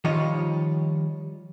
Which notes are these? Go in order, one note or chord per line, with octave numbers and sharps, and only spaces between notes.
D#3 F3 G3 F4 C#5 D#5